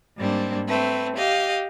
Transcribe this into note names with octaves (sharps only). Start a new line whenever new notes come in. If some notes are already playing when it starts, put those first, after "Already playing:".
G#2 G3 A#3 C4 D4
A3 C4 B4
G4 D#5 F5